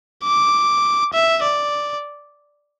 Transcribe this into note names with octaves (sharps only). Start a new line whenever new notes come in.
D6
E5
D5